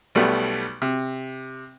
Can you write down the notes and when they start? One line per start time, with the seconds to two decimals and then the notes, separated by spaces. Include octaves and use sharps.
0.15 B1 G3 A3 B3
0.82 C3